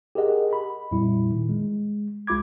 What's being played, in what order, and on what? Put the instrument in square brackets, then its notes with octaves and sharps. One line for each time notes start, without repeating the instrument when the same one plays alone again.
[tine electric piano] G4 G#4 A#4 D#5 F#5
B5
F2 A#2 G3 E4
A#2 D#3
G#3
C2 G#3 F4 B5 D6 G#6